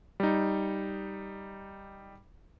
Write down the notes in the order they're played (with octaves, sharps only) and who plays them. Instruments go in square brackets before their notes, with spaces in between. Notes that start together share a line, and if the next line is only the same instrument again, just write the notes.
[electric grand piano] G3 D#4